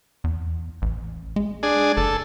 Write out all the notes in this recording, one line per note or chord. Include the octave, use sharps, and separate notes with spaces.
E2
A1
G#3
D4 G#4
F#1 A4